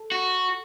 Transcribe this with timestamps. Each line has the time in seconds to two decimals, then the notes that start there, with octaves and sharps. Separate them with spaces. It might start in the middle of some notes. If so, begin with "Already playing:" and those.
Already playing: A4
0.12 F#4